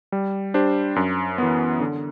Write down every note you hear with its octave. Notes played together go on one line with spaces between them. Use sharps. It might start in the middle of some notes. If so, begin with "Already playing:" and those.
G3
D4 G4 C5
F#2
E3 B3
D3